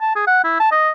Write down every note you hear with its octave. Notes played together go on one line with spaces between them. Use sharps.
A5
G#4
F#5
E4
A5
D#5